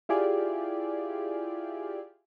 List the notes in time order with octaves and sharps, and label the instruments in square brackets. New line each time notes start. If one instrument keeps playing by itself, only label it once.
[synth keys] E4 F4 G4 G#4 D5